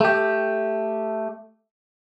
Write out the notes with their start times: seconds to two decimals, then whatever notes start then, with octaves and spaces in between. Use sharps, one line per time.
0.01 A3 G4